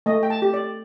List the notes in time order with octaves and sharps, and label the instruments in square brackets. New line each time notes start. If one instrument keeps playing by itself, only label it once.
[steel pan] A3 D#5
G5
A5
G4
D5